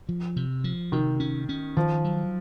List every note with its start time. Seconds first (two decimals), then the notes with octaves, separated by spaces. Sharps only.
0.09 F3
0.36 C3
0.64 F3
0.92 C3 D#3
1.20 C#4
1.49 C#4
1.77 D#3 F3
2.04 F#3